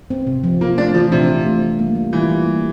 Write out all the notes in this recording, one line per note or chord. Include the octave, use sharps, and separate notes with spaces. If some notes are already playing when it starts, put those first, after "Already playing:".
C4
C3
F3
A#3 F4
A3 D4
E3 F3
C3 D4
F4
A3
G3
A#3
G3
E3 F4
G3
A#3